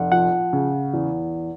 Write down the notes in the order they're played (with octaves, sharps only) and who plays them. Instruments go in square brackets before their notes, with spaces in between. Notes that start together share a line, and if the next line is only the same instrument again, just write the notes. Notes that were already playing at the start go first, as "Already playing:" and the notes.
Already playing: [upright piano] F1 [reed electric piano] F#5
[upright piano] F3 [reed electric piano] F#5
[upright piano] C#3
E2